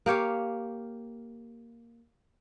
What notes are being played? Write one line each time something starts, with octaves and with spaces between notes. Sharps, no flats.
A#3 G4 C#5 F5